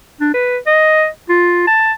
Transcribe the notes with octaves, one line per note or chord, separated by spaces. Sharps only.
D4
B4
D#5
F4
A5